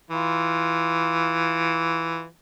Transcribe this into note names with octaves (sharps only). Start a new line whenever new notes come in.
E3 F4